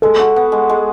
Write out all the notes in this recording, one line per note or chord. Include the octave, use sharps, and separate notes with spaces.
G#3 A4
F#4
B3
G#3
G#3